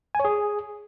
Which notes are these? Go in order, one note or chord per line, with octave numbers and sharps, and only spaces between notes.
G#5
C#5
G#4